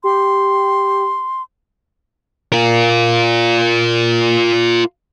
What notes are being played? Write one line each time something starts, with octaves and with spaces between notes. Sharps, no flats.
G4 C6
F4 A#4